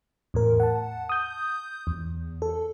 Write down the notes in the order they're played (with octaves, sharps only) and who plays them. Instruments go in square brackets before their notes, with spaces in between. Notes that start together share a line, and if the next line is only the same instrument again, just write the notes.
[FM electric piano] E2 A2 A#4
F#5 A5
D#6 G6
E2
A4